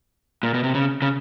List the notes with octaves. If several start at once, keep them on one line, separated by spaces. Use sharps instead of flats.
A#2
B2
C3
C#3
C#3